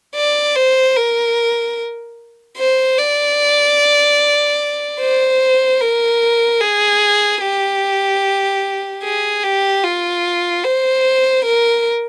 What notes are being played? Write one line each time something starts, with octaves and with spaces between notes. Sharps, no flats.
D5
C5
A#4
C5
D5
C5
A#4
G#4
G4
G#4
G4
F4
C5
A#4